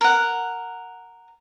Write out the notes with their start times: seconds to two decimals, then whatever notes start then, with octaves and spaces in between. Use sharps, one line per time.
0.01 A#4 F#5